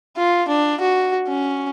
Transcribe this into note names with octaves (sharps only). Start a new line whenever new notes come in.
F4
D4
F#4
C#4